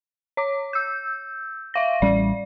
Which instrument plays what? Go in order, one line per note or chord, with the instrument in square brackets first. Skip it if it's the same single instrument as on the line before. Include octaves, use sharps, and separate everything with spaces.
[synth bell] C#5 D6
E6 G6
E5 F5 A#6
[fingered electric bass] A1 G3 C#4 [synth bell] D5